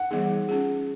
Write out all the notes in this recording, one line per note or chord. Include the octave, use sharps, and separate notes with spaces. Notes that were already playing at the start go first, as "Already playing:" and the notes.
Already playing: F#5
E3 G3 B3 D#4 G#4
C#4 F4 G#4